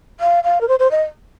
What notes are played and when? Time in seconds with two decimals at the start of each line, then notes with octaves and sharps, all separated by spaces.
0.20 F5
0.44 F5
0.61 A#4
0.68 C5
0.79 C5
0.91 D#5